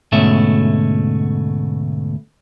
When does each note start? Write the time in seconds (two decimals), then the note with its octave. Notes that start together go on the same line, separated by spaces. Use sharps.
0.12 D2 G#2 B2 A3 C#4 E5